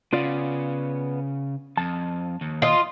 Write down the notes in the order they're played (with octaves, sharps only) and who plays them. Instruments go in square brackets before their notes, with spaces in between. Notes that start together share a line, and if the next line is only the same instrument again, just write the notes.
[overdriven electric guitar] C#3 [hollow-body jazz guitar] B3 F4 D5
[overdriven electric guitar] F2 [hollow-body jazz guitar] A5
[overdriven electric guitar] D#2
[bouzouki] F4 D#5